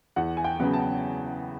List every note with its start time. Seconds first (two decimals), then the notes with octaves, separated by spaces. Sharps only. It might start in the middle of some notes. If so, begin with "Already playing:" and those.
0.16 E2 F#5
0.37 G#5
0.44 G5
0.60 C#3 F#3 B3
0.73 A5